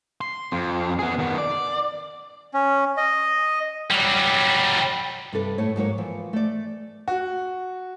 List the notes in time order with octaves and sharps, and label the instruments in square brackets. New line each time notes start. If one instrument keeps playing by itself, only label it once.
[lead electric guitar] C6
F2
B3 G#4
D#3 B3
D5
[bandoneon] C#4
D#5
[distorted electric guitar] F#3 G3
[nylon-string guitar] G2 C3 A4 B4
A2 A3 C#5
G#2 F#3 A#3 C#5
E3 F3
A3 D5
[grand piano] F#4